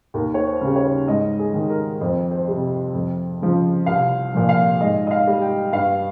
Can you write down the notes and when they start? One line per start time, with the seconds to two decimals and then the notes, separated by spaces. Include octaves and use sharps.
0.14 D#2 A#4
0.34 C#5
0.46 C5
0.61 C#3 G3
0.76 C#5
1.07 G#2 D#5
1.39 G#4
1.54 D#3 G3
1.70 A#4
2.01 F2 C5
2.31 C5
2.48 C3 G3
2.94 F2
3.40 C#3 F3
3.86 C2 F5
4.34 A#2 F3
4.49 F5
4.80 G#2 D#5
5.07 D#5
5.11 F5
5.27 G3
5.42 G5
5.73 G2 F5